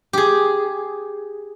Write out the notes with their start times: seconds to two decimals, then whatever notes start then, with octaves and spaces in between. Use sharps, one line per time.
0.13 G4 G#4